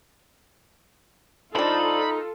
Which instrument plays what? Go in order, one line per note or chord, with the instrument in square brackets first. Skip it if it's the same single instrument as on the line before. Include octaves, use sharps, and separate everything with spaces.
[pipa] F3 D4 [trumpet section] D#4 [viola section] F4 A4 [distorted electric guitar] B5